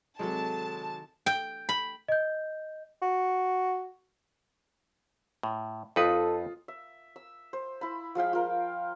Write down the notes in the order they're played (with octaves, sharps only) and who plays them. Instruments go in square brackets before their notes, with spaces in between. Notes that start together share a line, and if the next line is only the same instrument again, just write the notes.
[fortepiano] C3 F#3 G#3 [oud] D#3 A4 [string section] A5
[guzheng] G5
B5
[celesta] D#5 G6
[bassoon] F#4
[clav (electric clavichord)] A2
[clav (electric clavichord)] F2 D#4 B4 [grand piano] F4 D#6 [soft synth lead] A4
[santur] E5
E6
C5
E4 B5
F3 G#3 F5 G5
F4 A#4